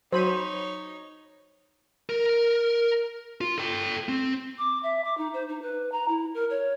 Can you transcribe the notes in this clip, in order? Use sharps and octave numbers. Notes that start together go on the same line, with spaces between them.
F#3 D#4 C5 C#5 B5 D#7
A#4
F4
A4 G5
C4
D6
E5
D6
D#4
C5
D#4
B4
A#5
E4
A#4
C#5